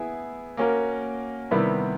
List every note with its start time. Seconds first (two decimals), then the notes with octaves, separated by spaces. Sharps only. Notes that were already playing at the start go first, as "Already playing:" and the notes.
Already playing: B3 E4 G#4
0.57 A#3 C#4 F#4 A#4
1.51 C3 D#3 G3 B3 E4